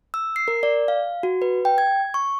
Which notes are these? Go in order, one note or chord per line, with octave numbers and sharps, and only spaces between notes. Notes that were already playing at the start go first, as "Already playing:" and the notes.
E6
C7
A#4
D5
F5
F#4
B4
G5
G#6
C#6